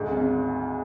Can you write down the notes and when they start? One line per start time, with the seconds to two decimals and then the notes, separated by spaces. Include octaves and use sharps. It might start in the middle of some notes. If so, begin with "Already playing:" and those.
Already playing: D2 G#2
0.11 G#1